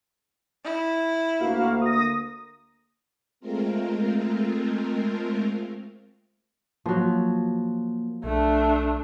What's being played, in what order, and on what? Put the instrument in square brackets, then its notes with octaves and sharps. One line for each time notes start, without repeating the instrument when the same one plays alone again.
[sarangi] E4
[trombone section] D2 A#3 [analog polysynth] F#4 F5
[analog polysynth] D#6 A#6
[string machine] G#3 A3 C4 F4 A#4
[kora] F3 F#3 [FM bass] A#3
[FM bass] B1 [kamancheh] A3 D4